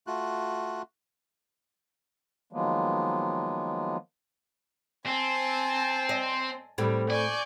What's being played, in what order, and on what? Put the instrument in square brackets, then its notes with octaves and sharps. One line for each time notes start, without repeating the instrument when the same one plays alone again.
[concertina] A3 F4 F#4 F#6
[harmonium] D#3 F3 F#3 G#3 A#3 B3
[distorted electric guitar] C4 [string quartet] G#5 A5
[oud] D#5
[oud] A2 C4 A4 [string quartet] G3
[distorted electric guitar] D5 [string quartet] G#5 C#6 G6